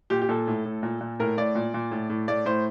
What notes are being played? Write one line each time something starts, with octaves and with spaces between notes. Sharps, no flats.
A#2 G4
G4
A#2 A4
A2
A2
A#2
A#2
A2 A#4
A2 D5
A#2
A#2
A2
A2
A2 D5
A2 C5